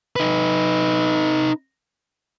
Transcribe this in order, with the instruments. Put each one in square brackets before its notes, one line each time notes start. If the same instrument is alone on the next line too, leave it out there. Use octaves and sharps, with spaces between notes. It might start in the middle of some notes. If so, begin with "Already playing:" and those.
[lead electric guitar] D#4 B4